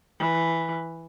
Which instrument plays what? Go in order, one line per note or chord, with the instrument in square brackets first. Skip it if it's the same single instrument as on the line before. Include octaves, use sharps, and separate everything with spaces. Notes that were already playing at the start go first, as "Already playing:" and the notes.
[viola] E3